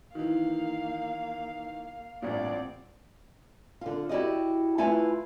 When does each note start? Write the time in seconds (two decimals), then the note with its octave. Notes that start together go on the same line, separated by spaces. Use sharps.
0.15 D#3 E3 A#3 F5
2.22 A1 G2 A#2 C4 D5
3.81 D3 F4
4.09 E4 F#4 G4 D5 D#5
4.78 A3 E4 F4 B4 G#5